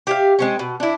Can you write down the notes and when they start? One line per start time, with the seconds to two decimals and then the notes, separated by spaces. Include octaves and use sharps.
0.07 G4 E5 F5
0.39 G#3 C4 C#4
0.59 B2
0.80 D4 E4